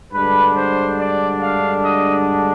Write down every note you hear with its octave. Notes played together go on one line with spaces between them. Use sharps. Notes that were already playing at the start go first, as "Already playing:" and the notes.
G2 D3 G#3 D4 B4
C5
D5
F5
D#5